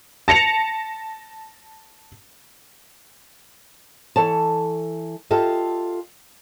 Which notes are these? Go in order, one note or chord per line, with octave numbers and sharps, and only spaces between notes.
A5 A#6 C#7 F7
E3 A4 C#5 A5
F4 G4 A4 D#5 E5